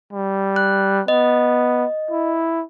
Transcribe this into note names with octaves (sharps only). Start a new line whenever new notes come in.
G3
F#6
B3 D#5
E4